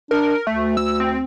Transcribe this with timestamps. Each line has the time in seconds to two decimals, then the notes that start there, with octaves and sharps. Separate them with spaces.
0.11 D4 A#4
0.47 D2 A3
0.77 E6
1.00 C4